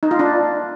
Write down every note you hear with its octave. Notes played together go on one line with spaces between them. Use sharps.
D#4
F4
D4